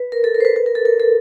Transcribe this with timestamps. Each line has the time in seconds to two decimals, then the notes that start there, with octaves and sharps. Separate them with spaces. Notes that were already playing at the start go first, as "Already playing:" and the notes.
Already playing: B4
0.12 A#4
0.24 A4
0.34 A#4
0.41 C5
0.45 B4
0.56 B4
0.66 A#4
0.75 A4
0.85 A#4
1.00 A4